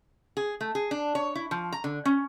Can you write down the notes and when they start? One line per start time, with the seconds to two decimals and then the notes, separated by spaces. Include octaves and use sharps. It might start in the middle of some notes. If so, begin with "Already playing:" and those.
0.37 G#4
0.61 A3
0.75 G#4
0.91 D4
1.15 C#5
1.35 E4
1.51 F3
1.72 A#5
1.84 D3
2.05 C#4